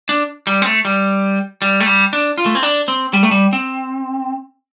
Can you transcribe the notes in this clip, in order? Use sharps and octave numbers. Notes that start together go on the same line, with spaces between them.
D4
G3
C4
A3
G3
G3
A3
G3
D4
F4
A3
C4
D4
C4
G3
A3
G3
C4